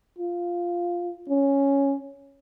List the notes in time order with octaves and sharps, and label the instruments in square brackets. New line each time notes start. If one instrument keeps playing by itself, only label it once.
[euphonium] F4
C#4